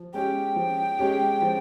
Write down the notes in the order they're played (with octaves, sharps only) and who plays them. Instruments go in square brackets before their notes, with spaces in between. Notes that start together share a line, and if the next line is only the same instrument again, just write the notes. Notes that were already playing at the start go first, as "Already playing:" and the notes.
Already playing: [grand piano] F3
[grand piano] G#3 C#4 G4 [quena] G5
[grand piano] F3
G#3 C#4 G4
F3